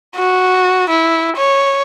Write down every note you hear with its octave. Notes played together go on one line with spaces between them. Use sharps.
F#4
E4
C#5